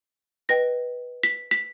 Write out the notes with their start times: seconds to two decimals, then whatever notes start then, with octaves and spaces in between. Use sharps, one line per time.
0.49 B4 D#5 G5 A#6
1.23 B6
1.51 B6